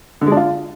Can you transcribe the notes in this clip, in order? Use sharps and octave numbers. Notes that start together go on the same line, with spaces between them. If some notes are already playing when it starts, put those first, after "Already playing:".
D3
G#3
D4
F4